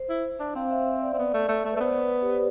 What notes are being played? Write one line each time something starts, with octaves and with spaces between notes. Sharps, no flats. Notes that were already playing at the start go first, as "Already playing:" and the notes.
Already playing: C5
E4
D4
C4 F5
E5
E5
D5
C4
B3
A3
A3
A3
B4
A3
B3 C5
B4
G4